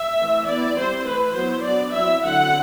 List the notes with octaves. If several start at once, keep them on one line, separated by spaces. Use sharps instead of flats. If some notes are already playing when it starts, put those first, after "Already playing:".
Already playing: E5
E3 A3 C4
E3 B3 E4 D5
G3 C4 E4 C5
E3 A3 E4 B4
F#3 B3 E4 C5
F#3 B3 D4 D5
F#3 C4 E4 E5
D3 F#3 C4 E4 F#5